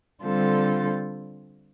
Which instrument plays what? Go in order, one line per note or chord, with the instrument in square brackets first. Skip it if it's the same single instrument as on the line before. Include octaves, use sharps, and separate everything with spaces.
[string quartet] D3 G3 C4 F4 A4